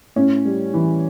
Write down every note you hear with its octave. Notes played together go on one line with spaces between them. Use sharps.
A2 C#4
G3
E3